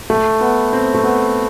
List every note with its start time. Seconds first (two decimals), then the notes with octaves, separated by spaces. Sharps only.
0.10 A3
0.41 B3
0.73 C4
0.94 A3
1.03 B3